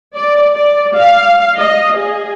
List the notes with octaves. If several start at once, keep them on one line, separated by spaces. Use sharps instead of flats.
D5
D5
F5
D#5
G#4